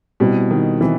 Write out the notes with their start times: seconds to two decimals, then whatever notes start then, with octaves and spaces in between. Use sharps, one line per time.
0.20 B2 G3 C4 E4
0.51 D#3
0.81 E3 C4 E4